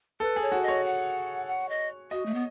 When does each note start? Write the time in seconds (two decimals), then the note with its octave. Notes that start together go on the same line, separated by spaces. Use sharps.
0.20 A4 B4
0.36 G#4
0.42 C#5
0.52 F#4
0.62 D#5
0.68 C#5
0.84 F#5
1.47 F#5
1.69 D#5
2.11 F#4 D#5
2.26 A3
2.34 B3